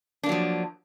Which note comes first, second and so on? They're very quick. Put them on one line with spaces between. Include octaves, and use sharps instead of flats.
D4 A#3 F#3 F3